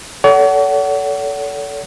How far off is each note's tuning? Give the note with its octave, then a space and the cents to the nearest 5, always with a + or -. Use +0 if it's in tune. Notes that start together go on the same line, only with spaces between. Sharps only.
A4 +0 C#5 +45 F#5 +25